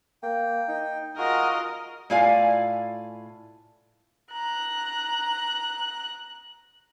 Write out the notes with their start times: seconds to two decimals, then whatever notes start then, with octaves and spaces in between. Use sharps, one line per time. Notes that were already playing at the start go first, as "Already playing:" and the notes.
0.23 A#3 G5
0.68 D#4
1.18 F4 F#4 G#4 A#4 D#5
2.10 A2 E4 F4 D5 F5 G#5
4.32 A#5 F#6